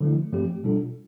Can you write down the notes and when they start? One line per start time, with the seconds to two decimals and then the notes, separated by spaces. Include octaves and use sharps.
0.01 D3 F3 A3 E4
0.32 G2 F3 A3 C4 G4
0.64 B2 G3 D4 F4 A4